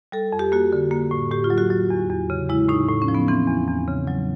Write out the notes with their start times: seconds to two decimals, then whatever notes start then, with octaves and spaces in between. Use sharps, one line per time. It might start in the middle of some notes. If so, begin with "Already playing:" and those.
0.12 G3 A4
0.33 F2
0.39 G4
0.52 A#3 F#4
0.73 D3
0.91 A#3
1.11 A2
1.31 A2 G4
1.44 F4
1.50 F#3
1.58 F#4
1.70 F#3
1.90 E2
2.10 E2
2.30 C#3
2.49 G#3 E4
2.68 A2 D#4
2.88 A2
3.02 C#4
3.08 F3
3.15 B3
3.28 E3 C4
3.47 E2
3.67 E2
3.88 C#3
4.07 F#3